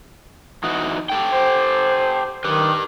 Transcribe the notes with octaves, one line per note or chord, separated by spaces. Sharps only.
E3 D#4 F#4
G4 A4 G5
C5
D#3 G4 B4